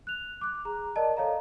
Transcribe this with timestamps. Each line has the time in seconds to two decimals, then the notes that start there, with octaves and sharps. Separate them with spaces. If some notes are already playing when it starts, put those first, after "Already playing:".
0.07 F#6 F7
0.41 D6 F#6
0.65 G#4 A#5
0.96 A#4 D5 D#5 A5
1.17 A4 C#5 D#5 F5 A#5